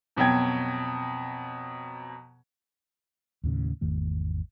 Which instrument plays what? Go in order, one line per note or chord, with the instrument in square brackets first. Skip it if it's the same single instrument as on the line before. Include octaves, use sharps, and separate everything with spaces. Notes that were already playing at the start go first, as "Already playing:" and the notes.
[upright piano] F2 B2 F#3 G5 G#6
[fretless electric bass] D#2 A2 C#3
G#1 E2 D#3 A3